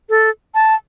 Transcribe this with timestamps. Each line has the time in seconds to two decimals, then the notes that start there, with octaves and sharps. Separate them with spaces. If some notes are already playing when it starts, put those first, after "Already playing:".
0.09 A4
0.55 A5